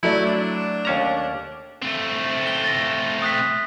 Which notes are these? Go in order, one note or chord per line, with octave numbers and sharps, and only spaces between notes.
F#3 A3 E4 D5
D4
D#2 C#4 A#5
A3 C4
G7
A6 A#6
D#6 F#6 B6